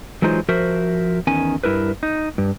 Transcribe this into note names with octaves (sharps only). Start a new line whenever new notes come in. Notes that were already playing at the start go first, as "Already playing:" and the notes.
E3 F#3 G#3 D#4 F4 C5
F3 F#4 A#4 C5 E5
E2 D#3 C#4 G#5
G2 E4 A#4 B4
D#4
G2